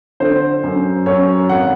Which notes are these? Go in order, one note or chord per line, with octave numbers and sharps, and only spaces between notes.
D3 C5
F#2
F#2 C#5
G#1 F#5